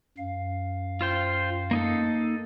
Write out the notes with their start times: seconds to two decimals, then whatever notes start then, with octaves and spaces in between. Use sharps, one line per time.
0.18 F#2 F5
1.01 F4 C5 G5
1.71 A#3 D#4 A4